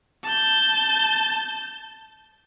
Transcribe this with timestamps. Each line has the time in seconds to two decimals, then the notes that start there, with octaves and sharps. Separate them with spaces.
0.24 A5 G6